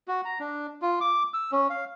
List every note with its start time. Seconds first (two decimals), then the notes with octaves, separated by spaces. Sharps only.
0.08 F#4
0.25 A#5
0.40 D4
0.82 F4
1.01 D6
1.34 E6
1.52 C#4
1.70 F5